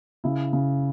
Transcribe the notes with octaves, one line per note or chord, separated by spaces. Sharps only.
C#3 E4
C#3